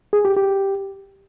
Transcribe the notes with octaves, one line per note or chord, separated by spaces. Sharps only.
G#4
G4
G4